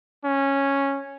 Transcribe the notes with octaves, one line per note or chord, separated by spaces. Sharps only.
C#4